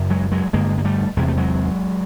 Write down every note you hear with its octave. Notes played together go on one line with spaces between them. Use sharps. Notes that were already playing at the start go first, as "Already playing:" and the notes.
Already playing: F#2 C#3
F#3 G#3
F#3 G#3
G2 D3 G#3 A#3
A#3
G3 A3
E2 C3 G#3
A3
F#3 G#3